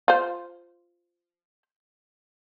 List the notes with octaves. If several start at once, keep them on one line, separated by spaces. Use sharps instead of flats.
F4 C5